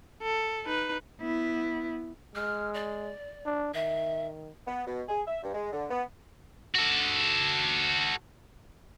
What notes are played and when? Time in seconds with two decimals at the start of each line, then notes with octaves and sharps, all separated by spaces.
0.22 A4
0.65 D#4 B4
1.22 B3 E4
2.35 G#3 F6
2.74 D5
3.46 D4
3.74 D#3 E5
4.67 B3
4.87 B2
5.09 G#4
5.27 E5
5.42 G2
5.55 G#3
5.73 D3
5.90 B3
6.75 F#4 A4